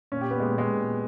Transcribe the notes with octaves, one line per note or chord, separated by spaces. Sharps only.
A#2 C#4
G4
B3
A#2 G#3
G#3
A#2